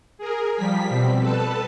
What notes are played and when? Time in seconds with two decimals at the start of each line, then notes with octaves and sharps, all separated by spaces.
0.18 G#4 A#4
0.56 F3 G3 B6
0.89 B2 G3 C4
1.19 A4 B4 A5